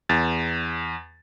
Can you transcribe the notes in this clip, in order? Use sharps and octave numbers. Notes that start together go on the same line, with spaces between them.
E2 A6